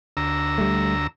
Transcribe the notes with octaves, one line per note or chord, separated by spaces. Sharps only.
D2 A#5 E6
G3 A3